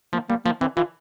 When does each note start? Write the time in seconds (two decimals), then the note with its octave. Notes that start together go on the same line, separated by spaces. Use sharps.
0.13 F3 A#3
0.29 G3 A#3
0.45 F3 A#3
0.61 E3 C4
0.77 E3 F4